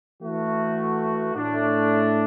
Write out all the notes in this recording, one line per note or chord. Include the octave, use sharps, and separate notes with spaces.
E3 A3 F#4
A2 A3 D4